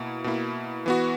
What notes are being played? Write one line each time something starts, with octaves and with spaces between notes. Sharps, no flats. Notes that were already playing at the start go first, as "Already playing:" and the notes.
Already playing: B2 A#3 E4
B2 A#3 E4
E3 B3 F#4